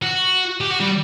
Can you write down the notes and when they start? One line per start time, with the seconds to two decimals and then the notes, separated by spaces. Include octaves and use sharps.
0.02 F#4
0.61 G4
0.71 F#4
0.81 G3